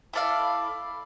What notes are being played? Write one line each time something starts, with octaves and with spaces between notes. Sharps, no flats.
E4 A4 D5 F5